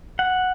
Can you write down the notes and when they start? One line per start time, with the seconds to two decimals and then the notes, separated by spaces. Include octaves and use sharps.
0.19 F#5